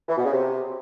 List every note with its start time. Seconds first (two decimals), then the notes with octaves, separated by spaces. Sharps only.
0.09 E3
0.17 B2
0.25 C#3
0.33 C3